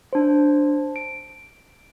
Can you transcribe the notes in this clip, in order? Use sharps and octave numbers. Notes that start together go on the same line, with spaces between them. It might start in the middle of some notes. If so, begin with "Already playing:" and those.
D4 C5
D7